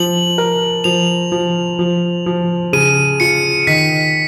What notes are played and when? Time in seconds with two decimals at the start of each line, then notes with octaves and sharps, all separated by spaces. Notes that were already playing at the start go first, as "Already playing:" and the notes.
Already playing: F3 F#7
0.38 A#4
0.84 F3 F7
1.32 F3
1.79 F3
2.26 F3
2.73 C#3 D#7
3.20 F4 C#7
3.67 D#3 B6